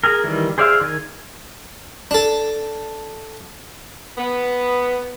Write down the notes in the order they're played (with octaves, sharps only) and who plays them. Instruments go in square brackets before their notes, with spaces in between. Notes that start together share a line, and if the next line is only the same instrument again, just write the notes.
[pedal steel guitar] G#4 A#4
D#3 E3 G3
G#4 C5 D5 E5 F5
D#3 G#5
[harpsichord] D4 A4
[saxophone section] B3